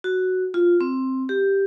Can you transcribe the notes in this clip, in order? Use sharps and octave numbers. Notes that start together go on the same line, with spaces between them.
F#4
F4
C4
G4